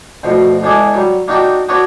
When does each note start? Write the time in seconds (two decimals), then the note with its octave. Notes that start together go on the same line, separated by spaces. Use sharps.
0.24 D2 B2 F3
0.63 E2 D3 G#3 D4 G#4 D6
0.94 F#3 G3
1.28 A#3 D4 D#4 F#4 G4 G5
1.69 B3 D4 F#4 B4 C#5 D5